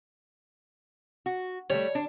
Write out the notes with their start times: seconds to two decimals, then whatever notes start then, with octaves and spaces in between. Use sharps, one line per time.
1.26 F#4
1.70 G3 A3 C#5
1.95 D4